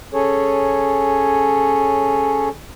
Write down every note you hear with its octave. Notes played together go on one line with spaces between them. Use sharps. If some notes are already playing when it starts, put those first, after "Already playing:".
C#4 G#4 A4 C#5